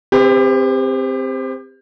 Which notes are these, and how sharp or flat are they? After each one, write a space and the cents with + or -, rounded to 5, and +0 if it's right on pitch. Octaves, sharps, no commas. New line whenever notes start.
C4 +0 G4 +30 B4 +35